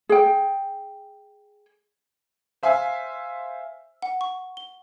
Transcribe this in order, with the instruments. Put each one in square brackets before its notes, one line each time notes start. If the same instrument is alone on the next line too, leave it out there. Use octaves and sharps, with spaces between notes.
[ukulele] G#4 G5
[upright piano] C5 E5 F5 G#5
[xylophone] F#5
C#6
G7